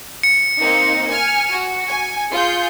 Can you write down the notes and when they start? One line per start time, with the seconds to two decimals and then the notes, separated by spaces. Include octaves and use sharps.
0.23 C#7
0.58 A#3 C4 D#4
1.10 G#5 F6
1.51 F#4
1.88 G#5
2.30 F4 G#4 G6